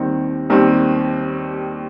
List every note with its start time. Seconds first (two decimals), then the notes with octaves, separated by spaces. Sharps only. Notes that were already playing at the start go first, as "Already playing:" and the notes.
Already playing: D#2 D#3 G3 C4
0.50 D#2 D#3 G3 C4